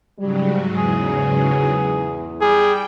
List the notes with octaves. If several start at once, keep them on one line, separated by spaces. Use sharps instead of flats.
G#2 C#3 F#3 G3
E2 G#4
G3 G#4 G5